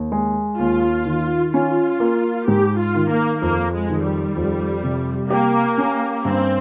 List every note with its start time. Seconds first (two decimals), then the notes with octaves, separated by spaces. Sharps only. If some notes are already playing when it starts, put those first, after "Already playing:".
Already playing: D#2
0.12 G#3
0.59 D#2 F4
1.06 D#3
1.53 C#4 F4
2.00 A#3
2.48 G#2 G4
2.79 F4
2.95 D#3
3.11 A#3
3.42 F2 A#3
3.73 G#3
3.90 D#3
4.05 G3
4.36 F2
4.83 C3
5.30 A#3 G4
5.78 C#4
6.25 G2 C4